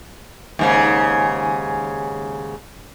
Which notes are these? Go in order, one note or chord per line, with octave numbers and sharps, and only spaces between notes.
D#2 G#2 C#3